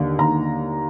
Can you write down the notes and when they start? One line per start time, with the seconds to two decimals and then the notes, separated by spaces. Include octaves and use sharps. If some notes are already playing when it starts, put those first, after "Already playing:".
Already playing: D#2 D3
0.18 D#2 A#5